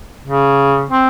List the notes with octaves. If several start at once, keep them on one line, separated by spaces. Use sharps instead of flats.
C#3
C4